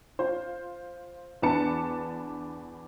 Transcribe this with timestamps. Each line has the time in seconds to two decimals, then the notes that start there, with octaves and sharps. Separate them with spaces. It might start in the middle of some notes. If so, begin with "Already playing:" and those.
0.19 F4 C5
1.42 E2 D4 B4 A5 C#7